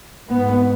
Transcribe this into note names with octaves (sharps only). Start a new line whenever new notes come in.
G#2 B3